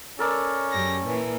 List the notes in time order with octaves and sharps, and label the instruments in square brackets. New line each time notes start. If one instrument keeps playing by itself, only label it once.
[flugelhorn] C#4 [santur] A4 A#4 D5
[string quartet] F#2 G4 A#6
A#2 E3 A#3